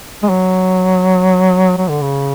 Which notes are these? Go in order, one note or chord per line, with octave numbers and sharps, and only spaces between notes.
G#3
F#3
F#3
D3
C#3